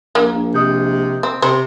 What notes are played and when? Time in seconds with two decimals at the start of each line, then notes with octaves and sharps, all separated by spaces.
0.15 A#1 A#3
0.33 A#1
0.54 C3 D#5 D#6 G6
1.23 C4
1.42 C3 C5